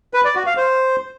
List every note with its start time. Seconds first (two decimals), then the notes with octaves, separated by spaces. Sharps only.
0.14 B4
0.25 D5
0.35 F#4
0.46 F5
0.57 C5